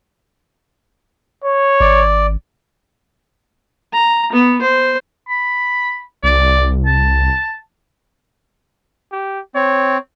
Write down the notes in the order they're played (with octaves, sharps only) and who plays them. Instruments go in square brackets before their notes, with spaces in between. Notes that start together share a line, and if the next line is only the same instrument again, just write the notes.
[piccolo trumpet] C#5
[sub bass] G#1 [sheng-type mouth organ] D5
[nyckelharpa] A#5
B3
C5
[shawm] B5
[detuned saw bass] C2 [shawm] D5
[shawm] A5
[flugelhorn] G4
[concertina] C4 [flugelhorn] C#5